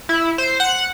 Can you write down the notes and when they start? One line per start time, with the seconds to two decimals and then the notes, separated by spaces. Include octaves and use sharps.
0.09 E4
0.38 C5
0.60 F#5